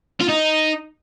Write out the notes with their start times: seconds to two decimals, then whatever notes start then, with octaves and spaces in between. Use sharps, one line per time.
0.21 F4
0.29 D#4